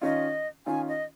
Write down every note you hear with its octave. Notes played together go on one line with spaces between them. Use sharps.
D#3 C#4 F4 D#5
D#3 C#4 F4 G#5
D#5